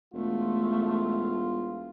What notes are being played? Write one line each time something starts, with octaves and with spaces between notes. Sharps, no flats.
E1 A3 F4